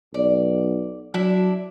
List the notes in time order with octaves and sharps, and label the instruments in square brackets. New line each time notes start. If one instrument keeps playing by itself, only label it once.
[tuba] B1 [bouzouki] D5
[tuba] F#3 [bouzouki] D4 E4 E5